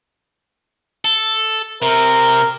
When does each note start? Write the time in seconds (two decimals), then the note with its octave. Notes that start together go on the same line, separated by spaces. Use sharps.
1.05 A4
1.82 C3 A#4